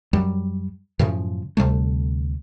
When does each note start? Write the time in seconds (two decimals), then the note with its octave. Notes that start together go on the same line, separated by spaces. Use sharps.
0.13 F#2 F#3 G3
0.99 F#2 A2 C#3 F3
1.57 D2 C3 G3 A3